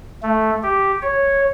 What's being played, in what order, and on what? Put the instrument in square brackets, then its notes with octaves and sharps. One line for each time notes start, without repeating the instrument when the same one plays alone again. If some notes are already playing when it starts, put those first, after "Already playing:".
[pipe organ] A3
G4
C#5